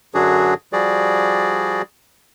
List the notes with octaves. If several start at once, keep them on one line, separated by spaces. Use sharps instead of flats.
F#2 D3 F#3 D4 F#4 G#4
F3 G3 F#4 G#4 D5